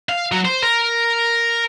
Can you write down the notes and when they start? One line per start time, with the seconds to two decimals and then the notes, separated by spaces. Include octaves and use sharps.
0.09 F5
0.32 F#3
0.45 C5
0.63 A#4